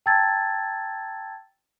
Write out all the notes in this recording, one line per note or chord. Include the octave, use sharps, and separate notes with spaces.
G5 A5 A#5 E6 G#6 A6